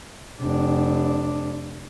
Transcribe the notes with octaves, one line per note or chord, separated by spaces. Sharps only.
F1 D4